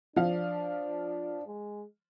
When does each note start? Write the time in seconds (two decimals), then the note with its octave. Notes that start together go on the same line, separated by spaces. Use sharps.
0.16 F3 D4 F5
1.46 G#3